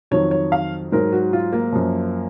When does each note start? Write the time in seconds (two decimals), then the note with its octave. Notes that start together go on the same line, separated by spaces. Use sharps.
0.11 F2 D#3 F#3 C#5
0.31 C#5
0.52 F5
0.92 G#2 F#3 A#4
1.13 F#4
1.33 F4
1.52 A#3
1.72 F#2 F3